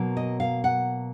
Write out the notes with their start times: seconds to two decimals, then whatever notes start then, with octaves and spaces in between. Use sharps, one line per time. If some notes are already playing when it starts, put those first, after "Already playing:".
Already playing: B2 F#3 A#3
0.17 D#5
0.40 F5
0.64 F#5